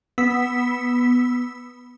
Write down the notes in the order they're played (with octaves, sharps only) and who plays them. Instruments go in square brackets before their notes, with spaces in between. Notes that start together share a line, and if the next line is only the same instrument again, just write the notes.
[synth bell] B3 E6 B6